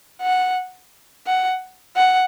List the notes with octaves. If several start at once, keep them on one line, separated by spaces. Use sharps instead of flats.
F#5
F#5
F#5